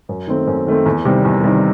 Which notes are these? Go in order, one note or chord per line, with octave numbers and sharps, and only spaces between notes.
F#2
D#3 A3 C4
F#2
D#3 A3 C4
E2
C3 D#3 G3
E2
C3 D#3 G3